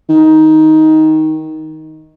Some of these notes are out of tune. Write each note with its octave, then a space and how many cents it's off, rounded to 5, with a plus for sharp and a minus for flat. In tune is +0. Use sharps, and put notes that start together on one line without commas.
D#3 +10